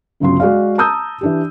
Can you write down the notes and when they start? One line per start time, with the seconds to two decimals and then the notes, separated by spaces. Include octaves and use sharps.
0.20 G1 C#2 C#3 F#3 C6
0.40 G#3 F#4 G#4 D5 F5
0.78 A5 A#5 D#6 E6 G6
1.21 E3 D4 G4